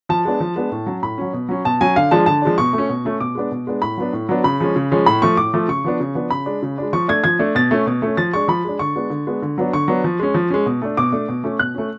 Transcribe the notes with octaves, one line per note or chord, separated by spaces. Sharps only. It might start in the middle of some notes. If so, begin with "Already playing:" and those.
F3 A5
G#3 B3 D4
F3
G#3 B3 D4
A2
F#3 C#4
A2 B5
F#3 C#4
B2
F#3 C#4
B2 A5
F#3 C#4 G#5
D3 F5
F3 G#3 D4 A5
D3 A5
F3 G#3 D4
B2 C#6
A3 C#4
B2
A3 C#4
B2 D6
G#3 B3 D4
B2
G#3 B3 D4
A2 B5
F#3 B3 D4
A2
F#3 B3 D4
C#3 B5
F3 G#3 C#4
C#3
F3 G#3 C#4
A2 B5
F3 A3 C#6
A2 D6
F3 A3
C#3 C#6
F3 B3 D4
C#3
F3 B3 D4
C#3 B5
G#3 D4
C#3
G#3 D4
F3 C#6
A3 D4 G#6
F3 G#6
A3 D4
B2 A6
A3 C#4
B2
A3 C#4
F3 A6
G#3 D4 C#6
F3 B5
G#3 D4
D3 C#6
G#3 B3 D4
D3
G#3 B3 D4
D3
F#3 B3 D4
D3 C#6
F#3 B3 D4
F3
G#3 C#4
F3
G#3 C#4
B2
A3 D4
B2 D6
A3 D4
B2
A3 C#4
B2 F#6
A3 C#4